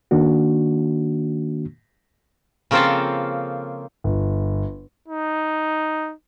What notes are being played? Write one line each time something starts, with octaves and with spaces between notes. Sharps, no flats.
D#3 A#3 D4 F#4
C#3 F3 A#3 C4 F4 A4
G1
D#4